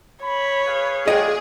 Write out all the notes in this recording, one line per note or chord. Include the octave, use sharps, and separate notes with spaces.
C#5 B5
G#4 B4 F5
F4 F#4 G#4 D5 D#5 G5